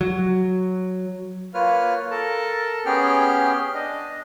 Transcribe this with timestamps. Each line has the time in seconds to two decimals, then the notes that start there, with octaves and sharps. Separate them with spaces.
0.01 F#3
1.54 A#3 F4 B4 C#5 F6
2.11 A4 A#4 A5
2.86 B3 C#4 G4 G#4 G5 F6
3.74 D4 D#5